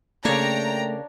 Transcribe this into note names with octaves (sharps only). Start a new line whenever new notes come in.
C#3 A3 A#3 D4 C#5 G5 A#5